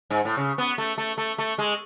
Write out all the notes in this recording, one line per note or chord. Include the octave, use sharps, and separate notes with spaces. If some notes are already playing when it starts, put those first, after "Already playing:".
G#2
A2
C#3
B3
A3
A3
A3
A3
G#3